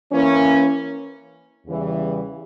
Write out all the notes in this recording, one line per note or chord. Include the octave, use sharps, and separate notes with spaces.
E3 A#3 C#4
E2 C#3 E3 G3